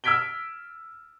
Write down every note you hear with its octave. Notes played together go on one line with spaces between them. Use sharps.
E6 F6 G#6 B6 D7 G7